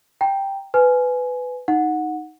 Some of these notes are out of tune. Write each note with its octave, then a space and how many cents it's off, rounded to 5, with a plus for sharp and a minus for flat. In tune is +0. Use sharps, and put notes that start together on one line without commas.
G5 +0 A#5 +0
B4 +15 G#5 +15
D#4 +5 F#5 -15